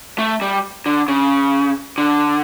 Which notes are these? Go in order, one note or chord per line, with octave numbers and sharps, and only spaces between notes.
A3
G3
D3
C#3
D3